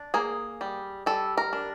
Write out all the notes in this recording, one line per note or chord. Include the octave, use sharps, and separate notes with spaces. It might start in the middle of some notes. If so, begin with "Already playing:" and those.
Already playing: D4
A#3 G#4
G3
G3 A4
A#4
D4